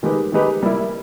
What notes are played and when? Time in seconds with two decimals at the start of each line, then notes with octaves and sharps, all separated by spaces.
0.03 D#3 G#3 D#4 G4 B4
0.32 D#3 G#3 D#4 G4 B4
0.63 G3 A#3 E4